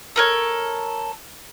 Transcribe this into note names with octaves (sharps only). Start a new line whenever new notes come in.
A4 A#4 C#5